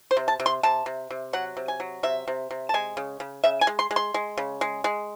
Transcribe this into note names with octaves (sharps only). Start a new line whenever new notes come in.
C5
C3
A5
C3
C6
C3 A5
C3
C3
F#3 F#5
C3
G#5
F#3
C3 E5
C3
C3
A5
G#3 G#5
C#3
C#3
C#3 E5
G#5
G#3
C6
G#3
C6
G#3
C#3
G#3
G#3